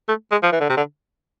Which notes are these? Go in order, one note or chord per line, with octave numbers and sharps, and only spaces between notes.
A3
G#3
F3
E3
D3
C3
D3